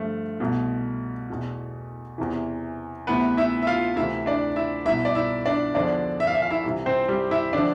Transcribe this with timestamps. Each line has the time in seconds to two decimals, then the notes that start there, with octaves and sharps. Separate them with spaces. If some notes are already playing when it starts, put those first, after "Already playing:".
Already playing: G2 D3 F3 A3
0.40 C2 B2
1.30 E2 B2
2.18 E2 C3 E3
3.07 D2 C3 E3 B3 B4
3.37 E4 E5
3.63 E5
3.67 F4 F5
3.96 D2 C3 E3 E4 E5
4.26 D4 D5
4.56 E4 E5
4.85 C2 B2 E4 E5
5.05 D5
5.15 E4 E5
5.46 D4 D5
5.75 E2 D3 F3 D4 D5
6.20 E5
6.27 F5
6.35 E5
6.42 F5
6.51 E4 E5
6.64 C2 C3 E3
6.86 C4 C5
7.08 G3 G4
7.31 E4 E5
7.53 D3 F3 D4 D5